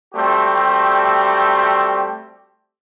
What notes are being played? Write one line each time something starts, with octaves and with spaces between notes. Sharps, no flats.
G3 A3 C4 F#4 G4